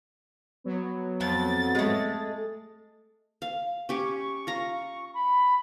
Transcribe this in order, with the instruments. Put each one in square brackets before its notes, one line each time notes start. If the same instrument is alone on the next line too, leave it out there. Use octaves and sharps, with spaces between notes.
[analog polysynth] F#3 B3
[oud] F2 [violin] A6
[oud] G#3 A3
[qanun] F5
[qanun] C#4 G4 D6 [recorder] C#6
[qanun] F4 A#5
[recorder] B5